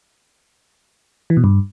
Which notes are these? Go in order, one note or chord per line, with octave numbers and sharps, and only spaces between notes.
E3
B2
G2